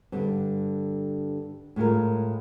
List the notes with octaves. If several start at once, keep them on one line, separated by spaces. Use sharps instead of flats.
G2 D3
A2 G#3 F4 A#4